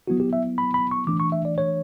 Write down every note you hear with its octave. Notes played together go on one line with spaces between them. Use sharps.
F#3 B3 E4 F#4
G4
E5
B5
B5
C#6
E3 A3 D4 D6
C#6
E5
D5
C#5